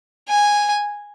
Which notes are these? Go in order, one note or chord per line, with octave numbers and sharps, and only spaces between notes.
G#5